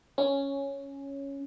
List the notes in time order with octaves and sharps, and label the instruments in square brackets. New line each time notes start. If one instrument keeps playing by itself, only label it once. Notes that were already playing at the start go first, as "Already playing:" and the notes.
[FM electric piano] C#4